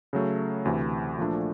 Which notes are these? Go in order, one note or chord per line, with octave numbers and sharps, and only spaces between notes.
C#3 F#3 A3
D2 C3 E3
A#2 F3 A3 D4